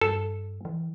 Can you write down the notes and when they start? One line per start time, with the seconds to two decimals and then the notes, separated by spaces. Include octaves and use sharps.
0.01 G2 A4
0.65 E3